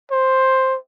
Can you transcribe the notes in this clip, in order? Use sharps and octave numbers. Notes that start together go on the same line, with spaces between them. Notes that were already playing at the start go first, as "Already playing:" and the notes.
C5